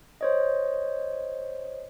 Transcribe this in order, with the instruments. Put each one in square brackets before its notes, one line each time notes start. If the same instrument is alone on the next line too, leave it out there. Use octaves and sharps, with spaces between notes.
[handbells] C5 C#5 D#5